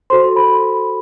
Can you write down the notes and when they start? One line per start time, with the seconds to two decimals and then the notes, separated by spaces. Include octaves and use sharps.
0.10 F#4 A4 C5 C6
0.36 B5